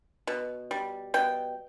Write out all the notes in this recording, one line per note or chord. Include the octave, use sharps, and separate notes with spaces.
B2
G3
B2 G5